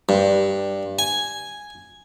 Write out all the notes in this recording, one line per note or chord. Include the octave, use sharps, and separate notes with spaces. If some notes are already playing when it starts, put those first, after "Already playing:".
G2
G#5